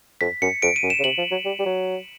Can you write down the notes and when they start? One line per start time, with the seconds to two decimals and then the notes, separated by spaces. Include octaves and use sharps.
0.21 F2 B6
0.42 F#2 C#7
0.62 F2 D7
0.76 D#7
0.83 F#2
0.90 E7
0.99 C#3
1.04 C3 F#7
1.18 F3
1.31 F#3
1.45 G3
1.59 G3
1.65 F#3